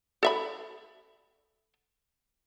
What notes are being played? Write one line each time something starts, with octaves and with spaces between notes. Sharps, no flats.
A4 E5 B5